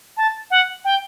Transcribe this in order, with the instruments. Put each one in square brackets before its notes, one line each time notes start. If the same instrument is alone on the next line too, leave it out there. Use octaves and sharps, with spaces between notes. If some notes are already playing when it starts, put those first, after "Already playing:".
[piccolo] A5
F#5
G5